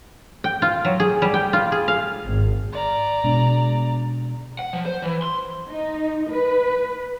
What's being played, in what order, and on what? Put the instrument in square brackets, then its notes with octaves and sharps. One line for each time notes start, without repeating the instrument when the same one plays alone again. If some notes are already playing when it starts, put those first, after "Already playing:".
[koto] G5
F4
F#3
G#4
G3
G5
F4
G#4
F5
[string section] G#1
[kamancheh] D5 A#5
[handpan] B2 G#3 D4
[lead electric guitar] F#5
F3
C5
E3
C6
[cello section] D#4
B4